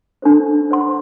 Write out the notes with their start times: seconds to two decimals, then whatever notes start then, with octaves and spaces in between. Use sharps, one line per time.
0.22 D4 A4 C5
0.71 C5 F#5 C6